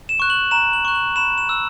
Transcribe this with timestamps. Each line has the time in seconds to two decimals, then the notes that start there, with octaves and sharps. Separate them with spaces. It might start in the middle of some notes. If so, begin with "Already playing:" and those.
0.09 E7
0.20 C#6 F#6
0.30 F#7
0.51 A#5 E7
0.73 F#7
0.85 C#6 F#6
0.95 F#7
1.16 B5 E7
1.38 E7
1.49 E6